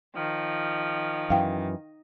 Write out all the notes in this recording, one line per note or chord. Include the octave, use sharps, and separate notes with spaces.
D#3 F3
F#2 E3 F5 G5